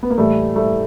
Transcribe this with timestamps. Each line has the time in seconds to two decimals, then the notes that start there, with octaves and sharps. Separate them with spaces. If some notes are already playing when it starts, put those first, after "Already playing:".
0.03 B3
0.10 A#3
0.18 A2 E3 G3 A3
0.55 G3 A3